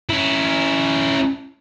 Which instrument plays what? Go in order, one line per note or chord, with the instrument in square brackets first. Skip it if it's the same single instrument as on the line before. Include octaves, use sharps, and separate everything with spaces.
[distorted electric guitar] C#4 E4